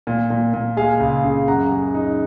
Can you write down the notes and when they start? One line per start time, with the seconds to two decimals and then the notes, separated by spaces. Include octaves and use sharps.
0.07 A#2
0.30 A#2
0.54 A#2
0.77 G#3 F5 G#5
1.00 C#2
1.24 C#3
1.48 F#2 F#5 A#5
1.71 G#3
1.94 D#4